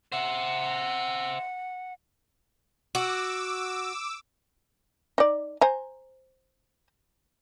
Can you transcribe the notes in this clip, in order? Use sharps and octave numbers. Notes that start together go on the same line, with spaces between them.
C5 E5 F#5
F#4 D6 E6
D#4 D5
C5 G#5 A#5